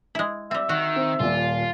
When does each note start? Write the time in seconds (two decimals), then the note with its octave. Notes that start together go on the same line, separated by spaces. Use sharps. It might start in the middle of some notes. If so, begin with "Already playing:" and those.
0.15 G#3 E4
0.51 G3 C4 E5
0.69 D#3 F#4
0.96 C4
1.19 D#1 A#2 F4